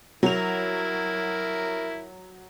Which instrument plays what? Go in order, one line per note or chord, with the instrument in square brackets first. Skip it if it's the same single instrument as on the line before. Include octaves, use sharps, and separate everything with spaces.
[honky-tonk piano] F#3 F7 [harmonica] E4 A#4